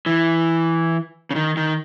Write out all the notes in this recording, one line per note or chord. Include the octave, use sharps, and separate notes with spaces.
E3
C#3
D#3
D#3